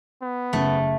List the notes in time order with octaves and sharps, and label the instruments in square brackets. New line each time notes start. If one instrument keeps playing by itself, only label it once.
[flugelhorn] B3
[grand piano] F#1 C#3 [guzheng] A3